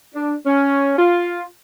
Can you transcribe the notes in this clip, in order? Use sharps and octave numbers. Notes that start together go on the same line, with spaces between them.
D4
C#4
F4